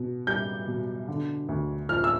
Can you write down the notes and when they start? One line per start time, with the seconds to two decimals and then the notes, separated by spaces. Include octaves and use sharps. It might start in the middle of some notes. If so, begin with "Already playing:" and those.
Already playing: B2
0.27 G3 G6
0.68 B2
1.08 D3
1.49 D2
1.89 F3 F6
2.04 E6